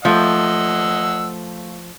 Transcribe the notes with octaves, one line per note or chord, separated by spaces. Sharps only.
F3 A3 D#5 F5 F#5 E6